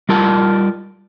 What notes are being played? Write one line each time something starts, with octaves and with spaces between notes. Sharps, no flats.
G3 F4 A#4 A5